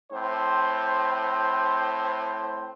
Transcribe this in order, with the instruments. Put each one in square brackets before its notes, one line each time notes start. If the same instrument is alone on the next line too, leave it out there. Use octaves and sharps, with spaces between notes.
[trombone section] A2 C4 C5